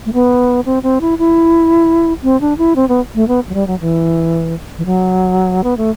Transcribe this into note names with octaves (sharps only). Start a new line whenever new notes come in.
A3
B3
C4
C4
E4
E4
C4
D4
E4
C4
B3
A3
B3
F#3
G3
F#3
E3
E3
F#3
B3
A3